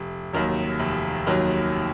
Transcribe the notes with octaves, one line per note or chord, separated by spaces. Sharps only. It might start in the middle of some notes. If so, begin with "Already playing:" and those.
Already playing: F1
D#2 D#3 F#3
F1
D#2 D#3 F#3